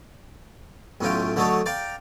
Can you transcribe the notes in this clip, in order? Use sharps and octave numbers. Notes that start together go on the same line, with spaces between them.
B1 A2 C#4 F4 G5
D3 F#3 A3 D#4 A4 C#5
D5 F5 G5 A#5